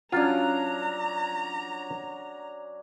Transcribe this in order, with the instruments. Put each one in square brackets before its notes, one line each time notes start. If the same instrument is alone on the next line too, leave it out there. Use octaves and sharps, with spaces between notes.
[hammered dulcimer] F#3 C#4 D4 [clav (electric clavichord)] F4 [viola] A#5